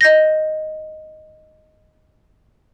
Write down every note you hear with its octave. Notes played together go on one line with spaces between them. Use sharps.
D#5 G6 A#6